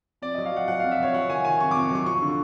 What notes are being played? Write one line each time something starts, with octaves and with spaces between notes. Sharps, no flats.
F2 D5
F#3 D#5
F5
F#3 F#5
F#3 F#5
F2 F5
E5
C3 C#5
F#3 F#5
D#3 G#5
D#3 G#5
C3 C#6
F2 D6
F#3 C#6
F3 C#6
D3